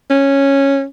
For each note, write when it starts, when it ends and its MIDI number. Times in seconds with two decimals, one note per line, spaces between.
0.10 0.85 61